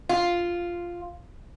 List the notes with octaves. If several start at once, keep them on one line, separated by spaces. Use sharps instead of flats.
F4